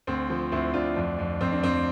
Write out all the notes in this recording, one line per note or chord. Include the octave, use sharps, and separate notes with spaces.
D2 C4
F3
D2 C4 E4
D2 D4 F4
F2 D4
F2
F2 C4
D4
F2 C4